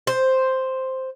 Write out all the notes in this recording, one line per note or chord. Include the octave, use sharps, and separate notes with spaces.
C5